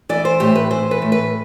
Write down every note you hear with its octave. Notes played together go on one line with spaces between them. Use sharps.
E3 D5
C5
A2 G4
B4
E3 C5
B4
A2
B4